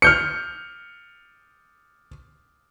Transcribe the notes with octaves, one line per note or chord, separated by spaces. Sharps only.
F6 G6 C#7